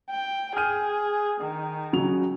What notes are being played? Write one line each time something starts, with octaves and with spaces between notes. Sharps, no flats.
G5
G#4 F6 G6 D#7
D#3
C#3 F#3 F7